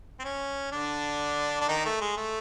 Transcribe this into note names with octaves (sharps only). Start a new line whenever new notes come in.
C4
C#4
D3 D4
D4
D#3 D#4
A3
G#3
A3